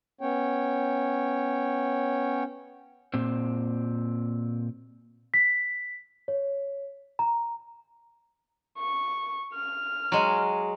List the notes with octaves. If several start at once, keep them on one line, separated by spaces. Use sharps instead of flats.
B3 C#4 C#5 G5
A#2 C4
B6
C#5
A#5
C#6
F6
F#3 G#3